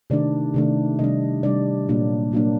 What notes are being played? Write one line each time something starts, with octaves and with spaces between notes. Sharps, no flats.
C3 D#3 A3 D4 D5
C3 D#3 A3 D4
C3 G3 D4 D#5
C3 G3 D4 D5
A#2 F#3 A#3 D4
A#2 F#3 A#3 D4